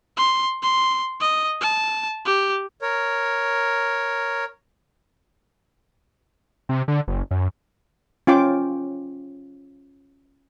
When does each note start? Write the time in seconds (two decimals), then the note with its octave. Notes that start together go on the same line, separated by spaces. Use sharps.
0.17 C6
0.63 C6
1.21 D#5
1.61 A5
2.26 G4
2.82 A#4 C#5
6.69 C3
6.88 D3
7.08 F#1
7.31 F#2
8.27 C#4 F4 G5 D6